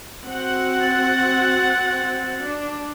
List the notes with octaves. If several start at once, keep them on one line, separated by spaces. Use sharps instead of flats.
C4 F#4 F#5
A6
D4